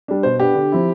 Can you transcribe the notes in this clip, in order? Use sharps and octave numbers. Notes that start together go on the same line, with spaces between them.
G3 D4
B2 C5
B3 D4 G4
D3
F3 C4 E4